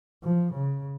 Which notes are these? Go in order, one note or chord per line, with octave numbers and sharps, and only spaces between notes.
F3
C#3